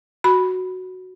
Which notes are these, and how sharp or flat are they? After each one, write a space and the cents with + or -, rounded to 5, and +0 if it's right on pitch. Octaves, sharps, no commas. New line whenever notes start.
F#4 +0 B5 +0